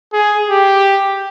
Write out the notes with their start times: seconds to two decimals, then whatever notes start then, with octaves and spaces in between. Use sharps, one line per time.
0.13 G#4
0.48 G4